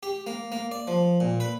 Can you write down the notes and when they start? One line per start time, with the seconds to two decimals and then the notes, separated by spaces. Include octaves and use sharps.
0.03 G4
0.27 A#3
0.52 A#3
0.72 D5
0.87 F3
1.20 A#2
1.40 B4